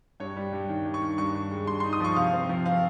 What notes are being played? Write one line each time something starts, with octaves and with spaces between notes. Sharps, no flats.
G2 C#5
G3
G2
D#3
G2
C#6
D#3
G2 C#6
G2
G#3
G2 C6
D#4 C6
D#6
F3 C#6
C3 F5
C4
F3
C4 F5